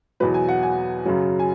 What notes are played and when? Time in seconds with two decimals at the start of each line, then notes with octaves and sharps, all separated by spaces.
0.20 E2 B2 F#3 B4
0.34 G#5
0.49 F#5
0.63 G#5
1.05 F#2 C#3 F#3
1.39 G#5